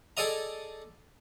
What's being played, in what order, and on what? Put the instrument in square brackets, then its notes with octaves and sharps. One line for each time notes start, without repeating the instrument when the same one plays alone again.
[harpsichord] G#4 A4 D5 D#5 A#5